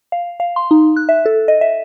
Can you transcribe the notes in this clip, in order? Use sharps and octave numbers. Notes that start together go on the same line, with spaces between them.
F5
F5
C6
D#4
F#6
E5
A4
D#5
E5